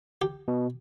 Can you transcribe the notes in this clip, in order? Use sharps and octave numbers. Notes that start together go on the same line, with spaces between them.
G4
B2